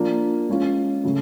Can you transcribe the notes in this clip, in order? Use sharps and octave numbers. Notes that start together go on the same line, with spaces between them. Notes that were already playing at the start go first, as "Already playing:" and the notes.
Already playing: F3 A#3 D4
F3 G#3 C#4 F4
C#3 F#3 A3